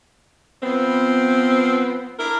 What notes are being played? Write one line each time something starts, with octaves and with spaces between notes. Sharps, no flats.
F3 B3 C4
D4 E4 A#4